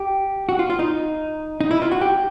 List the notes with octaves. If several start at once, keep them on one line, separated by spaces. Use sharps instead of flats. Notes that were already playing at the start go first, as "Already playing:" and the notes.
Already playing: G4
F#4
F4
F4
D#4
D#4
E4
F4
F#4
G4